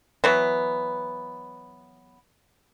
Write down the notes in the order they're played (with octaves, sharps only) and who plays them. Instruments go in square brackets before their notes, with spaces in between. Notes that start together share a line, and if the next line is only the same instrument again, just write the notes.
[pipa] E3 F#3 B3